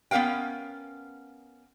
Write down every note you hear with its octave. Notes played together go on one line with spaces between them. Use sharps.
B3 C#4 A#4 F5 G5